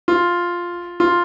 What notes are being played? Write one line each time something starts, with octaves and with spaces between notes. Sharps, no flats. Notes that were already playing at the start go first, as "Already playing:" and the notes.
F4
F4